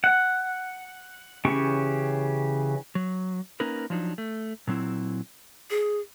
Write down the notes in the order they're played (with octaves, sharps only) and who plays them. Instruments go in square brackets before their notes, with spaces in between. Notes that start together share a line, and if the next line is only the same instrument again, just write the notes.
[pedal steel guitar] F#5
C#3 E3 C#4 G4 C#6
[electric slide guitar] F#3
A#3 C#4 D#4 A#4 B4
F3 F#3 D4 D#4
A3
A#2 F#3 C4 E4
[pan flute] G#4